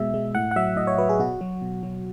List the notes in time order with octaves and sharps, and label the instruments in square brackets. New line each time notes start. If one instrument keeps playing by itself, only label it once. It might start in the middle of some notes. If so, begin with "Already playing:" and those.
Already playing: [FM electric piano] B2 G#3 E5
G#3
A2 F#5
F#5
F#3 E5
A2 D#5
C#5
F#3 B4
G#4
B2 F#4
F#3
B2
F#3